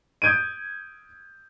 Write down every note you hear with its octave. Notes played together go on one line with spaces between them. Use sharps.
D#6 G6 G#6 D7 D#7